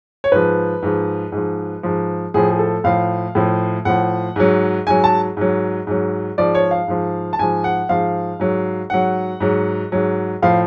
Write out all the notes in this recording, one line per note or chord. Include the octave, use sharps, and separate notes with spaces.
C#5
G#2 F3 B4
G#2 F3
G#2 F3
G#2 F3
A2 F3 G#4
G#4
A4
A2 F3 F5
A2 F3
A2 F3 F#5
G#2 F#3
G#2 F#3 G#5
A5
G#2 F#3
G#2 F#3
G#2 F3 D5
C#5
F5
G#2 F3
A5
G#2 F3 G#5
F#5
G#2 F3 F5
G#2 F#3
G#2 F#3 F#5
G#2 F#3
G#2 F#3
A2 F3 F5